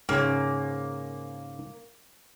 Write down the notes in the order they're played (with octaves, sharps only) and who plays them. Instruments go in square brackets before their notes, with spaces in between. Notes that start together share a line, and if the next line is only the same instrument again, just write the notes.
[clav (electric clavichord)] G#2 C#3 C#4 [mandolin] A#3